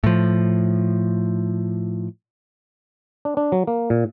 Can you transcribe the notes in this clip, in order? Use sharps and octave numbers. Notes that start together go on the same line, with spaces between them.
A2 F3
D4
D4
F#3
A#3
A#2